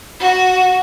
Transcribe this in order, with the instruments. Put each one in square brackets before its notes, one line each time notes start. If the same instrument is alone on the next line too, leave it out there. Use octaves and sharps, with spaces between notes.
[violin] F#4